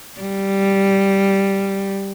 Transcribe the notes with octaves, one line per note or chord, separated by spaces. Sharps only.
G3